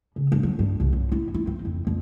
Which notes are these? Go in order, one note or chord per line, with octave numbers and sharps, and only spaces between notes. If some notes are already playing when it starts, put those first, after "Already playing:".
C#3
G2
F#3
G2
C2
F#2
E4
E4
C4
F2
F2